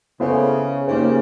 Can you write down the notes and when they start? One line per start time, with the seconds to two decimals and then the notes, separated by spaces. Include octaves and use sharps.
0.20 C#3 B3 E4 A4 C5 E5
0.87 C#3 A#3 D#4 G4 C5